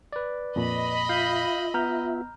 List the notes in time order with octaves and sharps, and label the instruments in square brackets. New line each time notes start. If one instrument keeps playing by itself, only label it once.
[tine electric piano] B4 D5
[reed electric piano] F2 A#2 [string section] D#5 B5
[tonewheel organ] F4 E5 [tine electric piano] F5 G6
[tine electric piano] B3 [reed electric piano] A#5 F6 G6